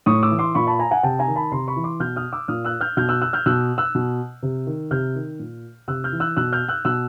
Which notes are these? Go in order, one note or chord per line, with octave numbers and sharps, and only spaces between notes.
A2 C#6 D#6
D6 E6
E3
C6 D6
A#2 B5 C#6
A5 B5
G#5 A#5
F#5 G#5
C3 G5 A5
G#5 A#5
D#3
A5 B5
C3 A#5 C6
B5 C#6
E3
C6 D6
B2 F6 G6
D#6 F6
D6 E6
A#2 D#6 F6
E6 F#6
F6 G6
B2 F6 G6
E6 F#6
E6 F#6
F6 G6
B2 E6 F#6
E6 F#6
B2
C3
D#3
C3 F6 G6
D#3
A#2
C3 E6 F#6
F6 G6
E3
E6 F#6
B2 E6 F#6
F6 G6
E6 F#6
B2 E6 F#6